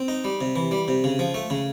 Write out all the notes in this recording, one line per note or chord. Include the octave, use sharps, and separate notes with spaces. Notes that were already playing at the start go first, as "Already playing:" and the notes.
Already playing: C4
D#4
G3
C3
E3
G3
C3
C#3
F3
A3
C#3